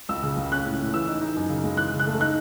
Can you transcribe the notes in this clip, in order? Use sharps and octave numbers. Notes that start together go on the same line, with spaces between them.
C#2 E6
C#3
C#2
C#4 F#6
A2
A2
E3 E6
D#4
D#4
F#2
C#3
G#3
E3 F#6
C#3
F#6
A3
D#4 F#6